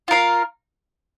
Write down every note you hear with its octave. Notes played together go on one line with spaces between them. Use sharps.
F4 A#4 F5